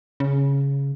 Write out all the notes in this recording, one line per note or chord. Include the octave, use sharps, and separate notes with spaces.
C#3